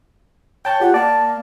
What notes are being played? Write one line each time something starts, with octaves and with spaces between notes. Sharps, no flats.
C#5 G5 A5 G6
F4 G4 F#5
A#3 D5 A5